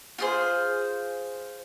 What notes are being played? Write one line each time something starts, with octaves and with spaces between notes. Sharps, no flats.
F4 G#4 C5